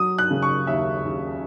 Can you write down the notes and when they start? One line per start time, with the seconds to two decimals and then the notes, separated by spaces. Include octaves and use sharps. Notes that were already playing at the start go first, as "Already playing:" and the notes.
Already playing: F#3 D#6
0.18 F#6
0.31 C#3
0.42 C#6
0.67 D#2 E5
1.03 D#2